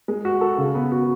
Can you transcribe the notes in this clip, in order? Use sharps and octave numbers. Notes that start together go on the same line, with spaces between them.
G#3
F#4
A4
C#3
B3
F#4